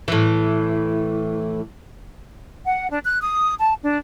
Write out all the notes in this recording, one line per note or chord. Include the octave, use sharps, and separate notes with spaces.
A2 E3
F#5
D4
F#6
D#6
A5
D4